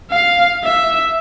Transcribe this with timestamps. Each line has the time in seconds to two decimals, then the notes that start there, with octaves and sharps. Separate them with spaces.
0.11 F5
0.64 E5